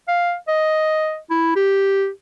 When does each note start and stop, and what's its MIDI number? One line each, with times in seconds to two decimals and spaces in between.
0.08 0.35 77
0.48 1.18 75
1.30 1.53 64
1.56 2.09 67